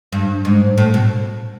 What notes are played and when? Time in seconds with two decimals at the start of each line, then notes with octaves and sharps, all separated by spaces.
0.12 G2
0.45 G#2
0.78 A2
0.94 B2